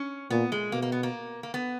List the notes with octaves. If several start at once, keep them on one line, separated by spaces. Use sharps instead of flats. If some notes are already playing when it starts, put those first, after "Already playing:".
Already playing: C#4
A#2 B3
G#3
B2 A#3
A#3
B3
A#3
A#3
B3